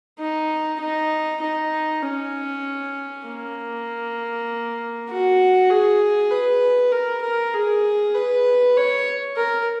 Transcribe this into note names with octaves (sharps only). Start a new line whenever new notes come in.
D#4
D#4
D#4
C#4
A#3
F#4
G#4
B4
A#4
A#4
G#4
B4
C#5
A#4